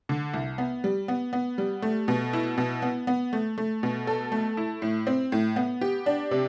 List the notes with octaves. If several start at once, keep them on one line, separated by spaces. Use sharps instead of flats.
D3
C2
B3
G3
B3
B3
G3
A3
B2
E4
B2
B3
B3
A3
A3
B2
A4
A3
E4
A2
C4
A2
B3
G4
D4
C3